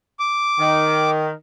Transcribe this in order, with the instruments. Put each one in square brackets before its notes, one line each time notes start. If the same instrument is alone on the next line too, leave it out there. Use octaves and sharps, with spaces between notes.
[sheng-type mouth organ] D6
[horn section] D#3